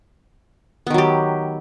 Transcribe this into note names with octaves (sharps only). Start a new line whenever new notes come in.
D#3 F#3 B3 G4